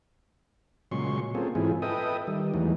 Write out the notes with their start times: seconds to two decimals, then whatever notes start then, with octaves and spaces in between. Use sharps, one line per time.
0.91 A#2 C#3 F#3 G#3 C6 C#6
1.35 A#3 C4 C#4 F4 G#4 A4
1.55 G#2 E3 C4 E4 F4 G#4
1.82 A4 B4 D#5 E5 G5 D#6
2.27 D#3 G3
2.54 E2 E3 F#3 G#3 A3 D#4